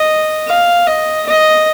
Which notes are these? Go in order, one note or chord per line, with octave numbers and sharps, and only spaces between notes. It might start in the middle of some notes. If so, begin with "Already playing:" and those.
Already playing: D#5
F5
D#5
D#5